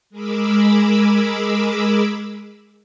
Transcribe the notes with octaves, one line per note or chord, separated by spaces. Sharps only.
G#3 G#4 A#4 B5 D6 E6